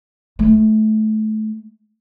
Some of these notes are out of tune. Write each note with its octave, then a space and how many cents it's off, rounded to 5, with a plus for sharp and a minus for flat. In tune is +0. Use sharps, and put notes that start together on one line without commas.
A3 -25